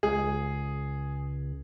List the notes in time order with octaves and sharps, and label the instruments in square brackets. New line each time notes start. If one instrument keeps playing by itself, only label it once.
[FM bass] C#2 [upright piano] G#4